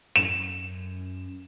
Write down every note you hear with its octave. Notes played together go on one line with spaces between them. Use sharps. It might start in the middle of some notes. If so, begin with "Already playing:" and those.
F#2 E7